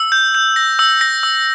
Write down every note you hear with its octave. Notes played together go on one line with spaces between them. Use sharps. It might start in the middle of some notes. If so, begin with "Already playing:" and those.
Already playing: E6
G6
G6
A#6
E6
A#6
E6